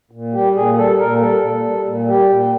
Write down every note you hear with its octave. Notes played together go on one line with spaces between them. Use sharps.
A#2
G3 G4
A#2 G#4
G3 A4
A#2 A#4
G3 A4
A#2
G3
A#2
G3 G4
A#2